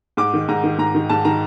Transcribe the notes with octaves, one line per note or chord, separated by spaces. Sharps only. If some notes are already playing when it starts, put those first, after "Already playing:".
G#2 D6
D#3
G#2 A#5
D#3
G#2 A#5
D#3
G#2 A5
D#3 A#5